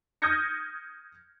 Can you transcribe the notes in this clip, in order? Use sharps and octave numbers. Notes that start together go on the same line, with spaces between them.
D#6 F6 G6 G#6 A#6 C#7